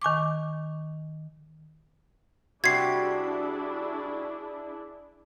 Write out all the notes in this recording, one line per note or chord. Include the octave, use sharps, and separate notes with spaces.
D#3 G#5 C#6 D6
C3 G3 D4 E4 F#4 G#4 G#6 C7